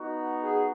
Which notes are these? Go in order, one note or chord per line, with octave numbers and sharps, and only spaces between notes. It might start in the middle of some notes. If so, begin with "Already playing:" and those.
Already playing: B3 D#4 F#4
G#4